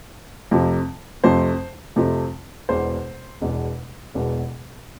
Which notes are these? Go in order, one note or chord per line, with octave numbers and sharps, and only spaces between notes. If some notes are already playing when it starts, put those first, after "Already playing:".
F2 C3 F3 A3
F2 C3 F3 A3 C5
F2 C3 F3 A3
E1 E2 B2 C5
E1 E2 B2
E1 E2 B2